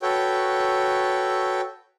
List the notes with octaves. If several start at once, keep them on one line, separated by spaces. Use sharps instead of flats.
F#4 A4 B4 C#5 G5